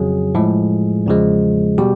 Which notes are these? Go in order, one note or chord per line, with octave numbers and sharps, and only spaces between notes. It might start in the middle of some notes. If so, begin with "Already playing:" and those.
Already playing: F2 C#3 F#3 G#4
A2 F3 G#3
E2 C#3 F3 G#3
B2 G3 G4